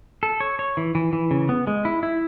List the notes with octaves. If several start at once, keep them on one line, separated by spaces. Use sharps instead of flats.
A4
C#5
C#5
E3
E3
E3
C#3
B3
G#3
E4
E4